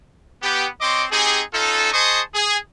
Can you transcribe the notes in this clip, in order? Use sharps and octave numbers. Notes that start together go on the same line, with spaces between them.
B3 G4
C4 C#5 D#5 C6 D6
C4 D#4 G4 G#4
C#4 D#4 F4 A4
G#4 C5 D#5 A5 C#6 D#6
G#4